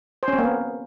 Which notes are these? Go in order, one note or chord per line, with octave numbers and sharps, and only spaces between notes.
C5
C#4
C4
A#3
B3